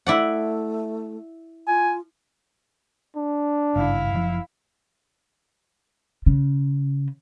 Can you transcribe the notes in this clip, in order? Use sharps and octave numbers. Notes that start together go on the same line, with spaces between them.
A3 E4 D5 F#5
F4 G#5
D4
G#1 G2 C#3 E4 F5
F#1 C#3 F3
C#3